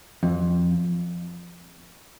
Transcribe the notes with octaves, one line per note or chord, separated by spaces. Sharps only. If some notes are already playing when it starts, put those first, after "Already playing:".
F2